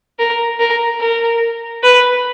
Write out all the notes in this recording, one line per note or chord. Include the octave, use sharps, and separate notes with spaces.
A#4
A#4
A#4
B4